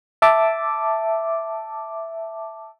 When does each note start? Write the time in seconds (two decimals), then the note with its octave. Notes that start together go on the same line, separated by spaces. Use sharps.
0.22 E5 A5 D6